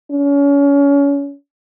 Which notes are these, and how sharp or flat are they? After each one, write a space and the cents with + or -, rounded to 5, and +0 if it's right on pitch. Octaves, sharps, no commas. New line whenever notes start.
C#4 +30